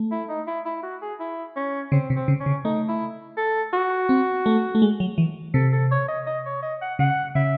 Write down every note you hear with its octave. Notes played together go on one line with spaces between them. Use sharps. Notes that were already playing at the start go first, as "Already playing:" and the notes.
Already playing: A3
E4
D#4
E4
E4
F#4
G#4
E4
C#4
C#3 C4
C3
C4
C#3
C#4
C#3
A3 D#4
E4
A4
F#4
C4
A3
A3
G#3
F#3
E3
C3 A4
A4
C#5
D#5
D#5
C#5
D#5
F#5
C#3 F#5
C#3 E5